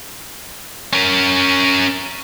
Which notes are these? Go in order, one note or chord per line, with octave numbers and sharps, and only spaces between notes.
C#4 A#4